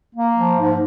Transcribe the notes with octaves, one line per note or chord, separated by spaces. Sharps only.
A#3
F3
G#2